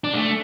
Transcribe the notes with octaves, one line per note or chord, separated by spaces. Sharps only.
D4
G#3
A3